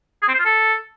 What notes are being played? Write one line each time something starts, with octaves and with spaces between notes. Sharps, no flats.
G#4
C4
C5
F4
A4